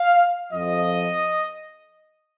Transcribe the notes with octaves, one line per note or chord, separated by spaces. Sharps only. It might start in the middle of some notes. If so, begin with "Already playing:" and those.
Already playing: F5
F2 F3 D#5